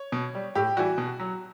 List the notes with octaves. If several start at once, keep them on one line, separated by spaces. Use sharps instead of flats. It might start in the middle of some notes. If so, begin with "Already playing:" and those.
Already playing: C#5
B2
G3
A2 G4
E3 G3 F#4
B2
F#3